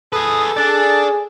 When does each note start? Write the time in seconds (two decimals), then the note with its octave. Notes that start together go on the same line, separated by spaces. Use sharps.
0.13 G#4 A4 B4 D#6
0.57 D4 G#4 D5 A6